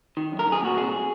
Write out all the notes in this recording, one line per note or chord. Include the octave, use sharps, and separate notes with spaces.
D#3
F#2
A#4
F#2
G#4
A#2 F#4
C2 G#4